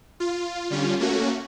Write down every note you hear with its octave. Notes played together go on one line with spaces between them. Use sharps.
F4
D3 G3 C#4 F4
A3 A#3 C#4 F#4